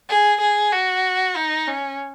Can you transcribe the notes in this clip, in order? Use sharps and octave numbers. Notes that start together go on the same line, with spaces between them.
G#4
G#4
F#4
D#4
C#4